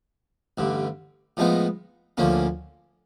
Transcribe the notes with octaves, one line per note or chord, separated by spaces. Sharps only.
A1 G2 D3
A2 F3 G#3 B3 D#4
D2 D3 F3 A#3 C#4